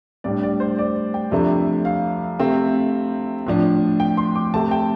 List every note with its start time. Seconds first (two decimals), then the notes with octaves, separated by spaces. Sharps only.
0.24 A2 G3 D4 D5
0.43 D5
0.60 C5
0.78 D5
1.14 G5
1.31 F2 C3 A3 D4
1.85 F5
2.39 C3 A3 C4
3.47 A2 F3 D4
4.00 G5
4.17 C6
4.35 D6
4.53 C3 A3 C4 A5
4.71 G5